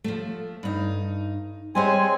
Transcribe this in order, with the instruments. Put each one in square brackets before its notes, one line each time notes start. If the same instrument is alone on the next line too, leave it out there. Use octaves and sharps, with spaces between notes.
[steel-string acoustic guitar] F3 A3
G2 D#4
[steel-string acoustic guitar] G3 C5 C#5 [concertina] G#3 C4 G#5